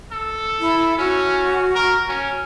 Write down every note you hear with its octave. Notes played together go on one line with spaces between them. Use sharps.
A4
E4
C#4 F#4
A#4
C#4